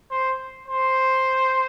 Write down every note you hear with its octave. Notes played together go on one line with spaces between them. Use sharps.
C5
C5